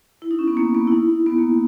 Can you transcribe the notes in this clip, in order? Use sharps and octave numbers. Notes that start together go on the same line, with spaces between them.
E4
D#4
C#4
B3
A#3
B3
E4
D#4
B3
A#3